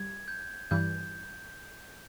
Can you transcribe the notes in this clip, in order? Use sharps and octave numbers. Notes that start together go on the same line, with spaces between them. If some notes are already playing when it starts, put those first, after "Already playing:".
Already playing: G3 G#6
G6
G2 E3 G3 G6